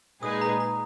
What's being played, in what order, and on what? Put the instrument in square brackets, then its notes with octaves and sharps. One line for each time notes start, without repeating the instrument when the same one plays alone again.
[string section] A#2 G#3 D#4 G#4 B4 [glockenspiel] D#6
[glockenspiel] A#5
A#5